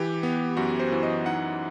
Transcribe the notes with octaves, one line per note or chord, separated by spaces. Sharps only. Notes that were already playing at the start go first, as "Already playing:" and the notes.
Already playing: E3 G4
B3
F#2 F#4
C5
E3
D#5
D#4 F#5